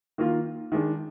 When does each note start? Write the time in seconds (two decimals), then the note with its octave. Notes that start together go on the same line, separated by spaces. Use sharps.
0.18 D#3 A#3 F4
0.72 D#3 G#3 D4